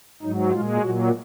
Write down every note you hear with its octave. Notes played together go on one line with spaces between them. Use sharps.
G#2 F#3 D#4
A#2 G#3 F4
A#2 F#3 F#4